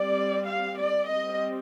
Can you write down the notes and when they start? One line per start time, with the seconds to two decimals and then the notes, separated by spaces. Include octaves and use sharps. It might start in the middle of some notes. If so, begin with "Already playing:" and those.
Already playing: G3 C4 D5
0.50 F5
0.80 D5
1.10 G3 C4 D#5